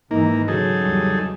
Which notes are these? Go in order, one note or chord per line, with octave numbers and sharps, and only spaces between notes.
G#2 D#3 E3 A#3 D#4
C#3 F#3 D#4 G#4 A4
E2 C#3 G3